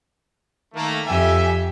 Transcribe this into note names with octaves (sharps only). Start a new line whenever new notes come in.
D#3 A3 A#3
F2 G4 E5 G#5